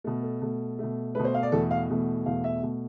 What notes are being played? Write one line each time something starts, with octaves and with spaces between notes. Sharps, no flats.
B2 A3 A4
A4
B2 A3
B2 A3
B2 A3 B4
C5
F5
D5
E2 B2 A3 A4
F5
E2 B2 A3
E2 B2 A3 F5
E5
B2 A3